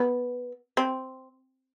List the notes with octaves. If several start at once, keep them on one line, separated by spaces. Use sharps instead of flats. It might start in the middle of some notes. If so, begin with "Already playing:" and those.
Already playing: B3
C4